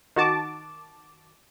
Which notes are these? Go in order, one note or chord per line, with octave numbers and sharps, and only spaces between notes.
D#3 F#4 A5 D6